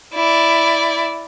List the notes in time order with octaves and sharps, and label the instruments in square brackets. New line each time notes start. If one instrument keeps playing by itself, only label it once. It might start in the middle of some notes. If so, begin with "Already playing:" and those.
[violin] E4 D5